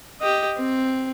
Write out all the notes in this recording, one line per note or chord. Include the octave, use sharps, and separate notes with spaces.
G4 D#5
C4